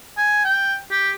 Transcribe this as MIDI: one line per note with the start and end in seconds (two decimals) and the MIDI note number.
0.18 0.44 80
0.45 0.75 79
0.91 1.11 67